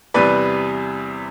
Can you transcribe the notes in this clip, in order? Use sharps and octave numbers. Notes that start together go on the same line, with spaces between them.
E2 C3 G3 B4 D5